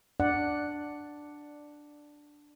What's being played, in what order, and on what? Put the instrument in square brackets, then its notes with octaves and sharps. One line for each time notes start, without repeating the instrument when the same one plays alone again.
[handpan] D4 D5 F#5